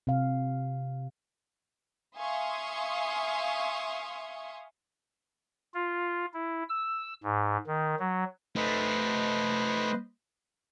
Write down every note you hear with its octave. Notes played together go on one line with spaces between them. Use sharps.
C3 F5
E5 F5 G#5 C6 C#6 D#6
F4
E4
E6
G#2
D#3
F#3
A3 D#4 B4 C5 D#5